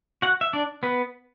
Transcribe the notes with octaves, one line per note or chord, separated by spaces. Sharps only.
F#4 F#5
E5
D4 D5
B3 B4